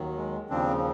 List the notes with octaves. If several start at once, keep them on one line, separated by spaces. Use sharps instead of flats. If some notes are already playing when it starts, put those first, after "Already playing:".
Already playing: D#2 D#3 F#3
G#3
D#2 C#3 F3 C4 D4